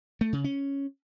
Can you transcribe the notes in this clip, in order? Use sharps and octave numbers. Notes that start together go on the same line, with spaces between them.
A3
C#3
C#4